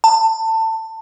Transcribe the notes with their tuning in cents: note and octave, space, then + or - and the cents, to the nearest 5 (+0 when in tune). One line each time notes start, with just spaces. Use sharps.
A5 +20